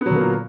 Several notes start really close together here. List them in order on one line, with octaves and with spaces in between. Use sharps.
B3 F#3 D3 A#3 A#2